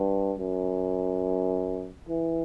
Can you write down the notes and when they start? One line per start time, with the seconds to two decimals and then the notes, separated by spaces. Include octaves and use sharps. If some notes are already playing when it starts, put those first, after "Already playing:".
Already playing: G2
0.39 F#2
2.08 E3